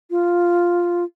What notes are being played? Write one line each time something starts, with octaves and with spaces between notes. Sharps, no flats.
F4